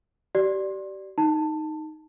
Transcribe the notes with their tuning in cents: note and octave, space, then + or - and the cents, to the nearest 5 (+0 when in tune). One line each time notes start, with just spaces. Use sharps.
G4 -30 D5 +0
D#4 +0 A5 +15